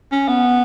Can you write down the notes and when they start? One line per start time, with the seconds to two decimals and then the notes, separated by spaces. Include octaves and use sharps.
0.12 C#4
0.28 B3